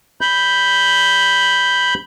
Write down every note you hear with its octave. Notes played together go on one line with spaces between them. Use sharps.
B5 G6